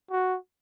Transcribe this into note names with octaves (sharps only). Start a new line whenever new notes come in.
F#4